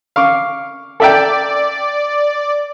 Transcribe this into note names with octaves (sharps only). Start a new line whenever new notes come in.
F5 C#6 D6
A4 D5 E5 G5